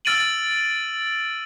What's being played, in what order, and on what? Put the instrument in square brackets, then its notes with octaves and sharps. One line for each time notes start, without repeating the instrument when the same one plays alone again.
[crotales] E6 F6 A6 D7 D#7 F#7